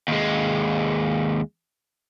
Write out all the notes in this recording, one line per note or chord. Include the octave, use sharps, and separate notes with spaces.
D#2 G#3